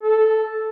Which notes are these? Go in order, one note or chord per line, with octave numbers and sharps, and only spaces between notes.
A4